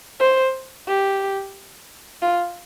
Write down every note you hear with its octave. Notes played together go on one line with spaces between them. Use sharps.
C5
G4
F4